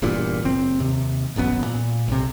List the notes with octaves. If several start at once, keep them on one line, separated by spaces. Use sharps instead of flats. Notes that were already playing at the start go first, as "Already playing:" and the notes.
E1 E2 G2 A#2
F#1 C4
D#2 C3
D#1 A1 F#2 B3
A#2
B1 C3